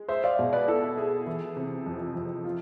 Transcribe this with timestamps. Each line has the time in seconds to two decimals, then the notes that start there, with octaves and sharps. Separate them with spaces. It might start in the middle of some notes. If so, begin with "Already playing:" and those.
Already playing: G#3
0.09 G#4 C5 E5
0.24 D5 F5
0.39 B2
0.53 B4 D5
0.68 E4 A4
0.97 G#4
1.27 E3
1.56 C3
1.86 F2
2.15 F2
2.44 F4